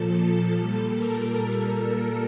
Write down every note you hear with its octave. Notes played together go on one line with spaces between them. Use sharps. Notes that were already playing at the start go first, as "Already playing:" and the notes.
Already playing: A#2 F3 A4
A#2 G3 A4
A#4